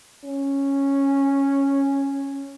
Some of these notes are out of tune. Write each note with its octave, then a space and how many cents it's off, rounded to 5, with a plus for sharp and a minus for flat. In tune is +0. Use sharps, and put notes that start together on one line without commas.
C#4 -5